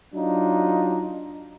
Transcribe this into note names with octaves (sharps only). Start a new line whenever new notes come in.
F#3 D4 D#4 F4